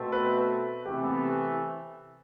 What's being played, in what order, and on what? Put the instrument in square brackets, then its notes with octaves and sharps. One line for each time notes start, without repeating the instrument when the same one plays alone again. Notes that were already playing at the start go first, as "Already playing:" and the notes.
Already playing: [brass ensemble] B2 A3 C4
[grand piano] B4
[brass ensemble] C3 E3 A3 [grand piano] G4
[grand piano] B3